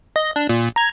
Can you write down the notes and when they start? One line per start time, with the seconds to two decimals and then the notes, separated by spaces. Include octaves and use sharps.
0.16 D#5
0.36 D4
0.49 A#2
0.76 A#5 G#6